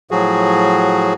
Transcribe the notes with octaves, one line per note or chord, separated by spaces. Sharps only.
A2 F3 F#3 F#4 G#4